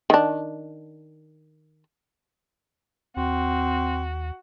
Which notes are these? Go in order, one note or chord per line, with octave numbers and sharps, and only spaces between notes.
D#3 D4
D#2 C4 F#4